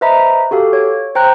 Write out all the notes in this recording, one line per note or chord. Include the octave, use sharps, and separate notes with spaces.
B4 C5 D#5 E5 A#5 B5
F#4 G4 A4 F5
C#5
C5 G5 A#5 F#6